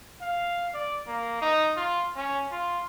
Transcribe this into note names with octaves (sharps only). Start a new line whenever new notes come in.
F5
D5
A#3
D#4
F4
C#4
F4